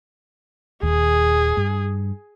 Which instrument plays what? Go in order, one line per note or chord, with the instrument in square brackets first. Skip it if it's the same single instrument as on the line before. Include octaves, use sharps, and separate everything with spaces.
[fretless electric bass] D#1 D#2 [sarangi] G#4
[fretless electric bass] G2